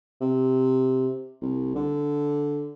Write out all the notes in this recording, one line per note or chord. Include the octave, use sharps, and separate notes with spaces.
C3
C2
D3